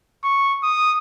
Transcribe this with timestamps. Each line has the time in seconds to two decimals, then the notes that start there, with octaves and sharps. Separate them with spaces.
0.24 C#6
0.64 D#6